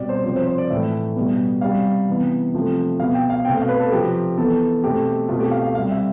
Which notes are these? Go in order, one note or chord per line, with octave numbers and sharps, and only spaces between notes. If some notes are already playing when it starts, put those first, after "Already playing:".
Already playing: B2 G3 C4 D5
C5
C3 F3 C4 C5
C5
C5
D5
A2 E3 A3 E5
B2 G3 B3
C3 G3 C4 F5
C3 E3 B3
C3 F3 A3
B2 B3 F5
G5
F5
B2 A3 C4 G5
F5
B4
A4
C3 F3 C4 G4
E3 B3 A4
B2 A3 C4 G4
B2 A3 C4 F4
G4
F5
F5
C3 G3 C4 F5
E5